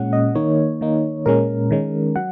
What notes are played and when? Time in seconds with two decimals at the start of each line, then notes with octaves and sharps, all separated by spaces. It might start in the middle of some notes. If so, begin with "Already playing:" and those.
Already playing: A#2 G#3 C#4 F#5
0.13 D#5
0.35 D#3 A#3 D#4 C#5
0.81 D#3 A#3 D#4
1.26 A#2 G#3 C#4 A#4
1.71 D#3 G#3 C#4
2.16 F#3 F#5